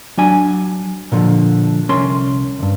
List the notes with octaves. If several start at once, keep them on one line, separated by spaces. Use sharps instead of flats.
F#3 D4 G#5
A#2 D3 F3
C2 C#4 A#4 C6
D2 G2